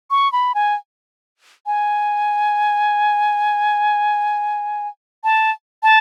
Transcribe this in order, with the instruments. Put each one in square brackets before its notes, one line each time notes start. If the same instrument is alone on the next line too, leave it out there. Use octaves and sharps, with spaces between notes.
[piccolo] C#6
B5
G#5
G#5
A5
A5